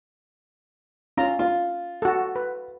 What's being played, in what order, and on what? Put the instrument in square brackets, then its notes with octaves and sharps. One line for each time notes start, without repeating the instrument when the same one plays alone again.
[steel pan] C#4 A#5 [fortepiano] F4
[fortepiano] F4
[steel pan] F#4 A4
B4